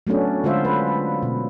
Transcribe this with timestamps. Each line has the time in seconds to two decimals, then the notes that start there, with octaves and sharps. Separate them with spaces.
0.07 F#3 A3 B3 C#4 D4
0.44 D3 G#3 F4 C5 E5
0.65 B4
1.23 B2